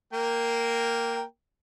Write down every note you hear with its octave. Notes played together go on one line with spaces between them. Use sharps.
A#3 A#4 G5